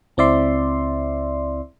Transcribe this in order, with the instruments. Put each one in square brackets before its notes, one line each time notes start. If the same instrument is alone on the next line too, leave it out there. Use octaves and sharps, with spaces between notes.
[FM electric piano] C#2 C4 E4 D5 E5 C6